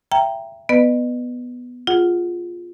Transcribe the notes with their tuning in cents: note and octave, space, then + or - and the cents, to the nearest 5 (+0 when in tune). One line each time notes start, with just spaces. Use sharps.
E5 +25 G5 +0 A#5 +0
B3 +0 B4 +0 D#5 -40
F4 +5 G#4 +0 F#5 +5